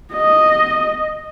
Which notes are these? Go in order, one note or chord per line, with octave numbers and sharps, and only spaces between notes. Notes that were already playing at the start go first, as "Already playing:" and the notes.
D#5